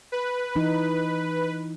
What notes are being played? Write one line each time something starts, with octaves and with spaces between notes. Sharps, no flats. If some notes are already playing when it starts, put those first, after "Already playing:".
B4
E3 D#4